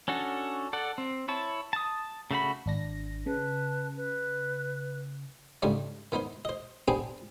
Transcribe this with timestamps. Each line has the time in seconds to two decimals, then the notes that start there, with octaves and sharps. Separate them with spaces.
0.08 C#4 D4 F#4 A4
0.73 A4 D5 F#5
0.98 C4
1.28 E4 C#5 A5
1.73 A5 D#6
2.31 C#3 A3 F#4 B5
2.66 G#1 D4 A#6
3.26 C#3 B4 A5
3.96 B4
5.62 G#2 C#3 G3 A3 D4 D#4
6.12 D#3 B3 D#4 C5
6.45 C5 D#5
6.88 B3 C4 D4 G4 G#4 C5